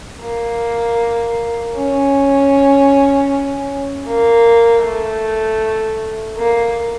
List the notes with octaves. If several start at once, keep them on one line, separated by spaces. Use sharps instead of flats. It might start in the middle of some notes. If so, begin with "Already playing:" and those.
A#3
C#4
A#3
A3
A#3